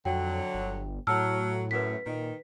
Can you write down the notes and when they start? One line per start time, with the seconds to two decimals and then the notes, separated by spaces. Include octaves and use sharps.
0.05 F2 D3 F#3 G5
0.54 G1
1.07 A2 F#3 A5 E6 F6
1.71 F#2 B4 B6
2.06 A#2 D#3